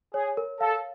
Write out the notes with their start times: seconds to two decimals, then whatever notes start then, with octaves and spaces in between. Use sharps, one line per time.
0.14 G#4 C#5
0.37 A#4
0.60 A4 F5